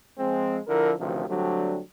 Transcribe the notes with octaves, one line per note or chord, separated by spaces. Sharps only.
F3 G#3 C4
D3 F3 E4 A#4
A1 D2 C3 D#3 F3
D3 F#3 G3 A3 C4 D4